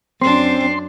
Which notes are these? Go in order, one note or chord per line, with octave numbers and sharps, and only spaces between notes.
F#2 C4 D4 C6